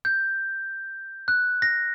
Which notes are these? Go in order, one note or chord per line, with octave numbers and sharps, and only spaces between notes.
G6
F#6
A#6